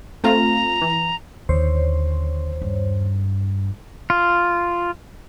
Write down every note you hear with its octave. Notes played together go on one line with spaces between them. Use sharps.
A3 C4 F4 A#5
E3
D#2 D3 C5 C#5
G2
F4